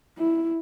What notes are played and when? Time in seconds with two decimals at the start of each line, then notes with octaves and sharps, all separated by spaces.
0.18 E4